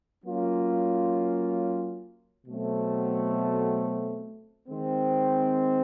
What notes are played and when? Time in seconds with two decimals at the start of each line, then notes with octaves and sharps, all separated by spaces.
0.24 F#3 A#3 C#4 F4
2.46 B2 F#3 A3 C4
4.68 D#3 G#3 C4